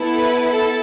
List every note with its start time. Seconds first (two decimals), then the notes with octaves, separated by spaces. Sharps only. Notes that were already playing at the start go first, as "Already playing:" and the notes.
Already playing: B3 E4 A4
0.18 B4
0.48 A4